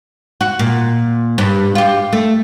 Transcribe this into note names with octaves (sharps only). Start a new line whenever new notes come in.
F#4
A#2
G2
F4 G4
A3